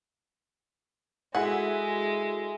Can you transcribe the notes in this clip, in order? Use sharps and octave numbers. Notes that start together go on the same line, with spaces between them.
G#3 E4 F#4 G#4 A4 F#5